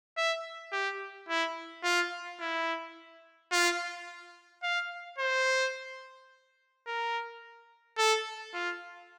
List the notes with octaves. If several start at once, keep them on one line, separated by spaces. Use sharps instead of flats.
E5
G4
E4
F4
E4
F4
F5
C5
A#4
A4
F4